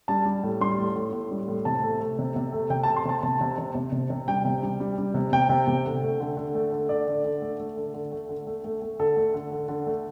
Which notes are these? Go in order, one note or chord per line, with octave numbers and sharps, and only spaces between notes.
G3 A5
G3
A2
G3 C6
A2
A2
A2
G3
A2
C3 A5
A3
A3
C3
C3
A3
C3 G5
A5
A3
C6
C3 A5
C3 A5
C3
C3
C3
C3
C3
G3 G5
C3
G3
G3
G3
C3
C3 G5
C3
C3
D3
A3
D3
D3
A3
D3
A3 D5
D3
D3
A3
A3
D3
D3
A3
D3
A3
A3
A3
D3 A4
A3
D3
D3
D3
A3